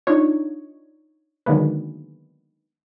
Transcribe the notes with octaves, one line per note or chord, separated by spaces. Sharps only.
D4 D#4 F4 C#5
D3 D#3 F#3 G#3 A#3 B3